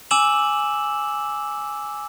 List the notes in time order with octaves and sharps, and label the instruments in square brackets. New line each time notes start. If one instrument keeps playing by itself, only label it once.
[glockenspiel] G#5 D6 E6 E7 F#7